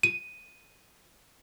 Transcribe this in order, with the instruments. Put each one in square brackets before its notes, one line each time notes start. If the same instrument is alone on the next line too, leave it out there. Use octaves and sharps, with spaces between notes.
[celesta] D#7